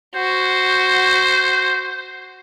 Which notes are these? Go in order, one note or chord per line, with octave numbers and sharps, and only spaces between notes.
F#4 C5